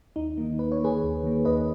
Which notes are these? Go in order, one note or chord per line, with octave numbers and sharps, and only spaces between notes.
D#2 D#4
D#3 A#3
D#2 B4
C#5
D#3 A#3 G#4 B4
D#2
D#3 A#3
D#2 B4 D#5